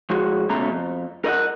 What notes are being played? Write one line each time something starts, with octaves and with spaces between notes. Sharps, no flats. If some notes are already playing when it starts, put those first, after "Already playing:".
F3 G#3 F#4
C#2 B2 A3 A#5
F2
A#4 D#5 E5 F#5